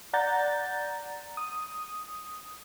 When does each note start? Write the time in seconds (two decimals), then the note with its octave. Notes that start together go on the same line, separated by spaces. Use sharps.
0.13 D5 F#5 A#5 G6 A6
1.37 D#6